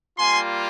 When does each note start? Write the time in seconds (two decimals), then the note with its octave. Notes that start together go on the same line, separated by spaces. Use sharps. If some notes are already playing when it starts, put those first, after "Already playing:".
0.18 G3 A#3 F4 G#5 C6